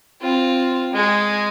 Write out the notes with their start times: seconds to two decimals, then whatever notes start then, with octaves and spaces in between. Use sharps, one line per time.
0.21 C4 F4
0.93 G#3 G#4